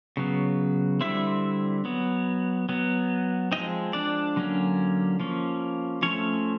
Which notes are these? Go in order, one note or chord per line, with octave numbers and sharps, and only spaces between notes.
C#3 F#3 B3
D3 G3 C4 E4 E5
F#3 B3
F#3 B3
F3 G#3 C4 D#4 D#5
D4 D5
D3 F#3 A#3 C#4
F3 A#3 C#4
F3 A3 C4 C#4 C#5